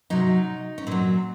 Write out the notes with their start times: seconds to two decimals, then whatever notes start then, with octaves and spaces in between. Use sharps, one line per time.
0.10 C3 F#3 D#4
0.78 C#4
0.87 A#2 F#3 C4